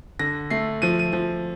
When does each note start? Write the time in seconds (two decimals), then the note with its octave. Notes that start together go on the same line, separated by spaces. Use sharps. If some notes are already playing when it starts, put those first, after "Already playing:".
0.19 D3 A#6
0.50 A3 C7
0.82 F3 D#7
0.99 D#7
1.13 F3